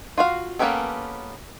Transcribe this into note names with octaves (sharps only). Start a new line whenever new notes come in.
F4 F#4 F5
A#3 B3 C#4 G4 A4